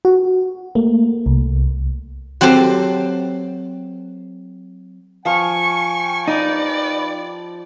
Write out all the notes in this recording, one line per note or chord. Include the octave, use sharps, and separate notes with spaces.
F#4
A3 A#3
C2
F#3 C4 G4 A4 C5
F3 F5 G5 G#5 C#6
D#4 G4 B4 D5 D#5